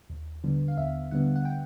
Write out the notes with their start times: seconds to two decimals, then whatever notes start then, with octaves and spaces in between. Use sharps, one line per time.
0.10 D#2
0.44 D3 G3 B3
0.68 F5
0.78 D#2 E5
1.11 D3 G3 B3 F#5
1.36 F#5
1.45 G5